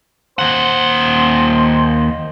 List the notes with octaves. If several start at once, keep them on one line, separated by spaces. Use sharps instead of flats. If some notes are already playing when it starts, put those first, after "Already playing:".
D#2 C5 F#5